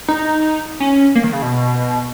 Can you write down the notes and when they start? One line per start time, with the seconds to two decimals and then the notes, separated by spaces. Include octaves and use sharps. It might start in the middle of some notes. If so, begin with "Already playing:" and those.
0.08 D#4
0.80 C#4
1.15 A#3
1.24 D#3
1.33 C#3
1.42 B2